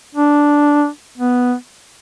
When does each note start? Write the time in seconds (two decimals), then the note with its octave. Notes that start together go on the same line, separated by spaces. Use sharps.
0.15 D4
1.18 B3